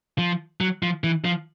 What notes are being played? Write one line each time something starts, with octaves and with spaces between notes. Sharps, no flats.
F3
F#3
F3
E3
F3